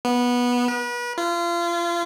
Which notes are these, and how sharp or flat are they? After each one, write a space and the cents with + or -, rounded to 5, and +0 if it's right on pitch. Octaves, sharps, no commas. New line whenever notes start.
B3 -15
B4 -35
F4 -30